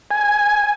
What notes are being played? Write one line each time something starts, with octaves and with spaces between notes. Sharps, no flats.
G#5